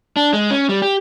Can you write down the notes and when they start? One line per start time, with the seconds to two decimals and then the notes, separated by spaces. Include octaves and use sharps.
0.17 D4
0.33 G#3
0.51 C#4
0.69 G3
0.82 G4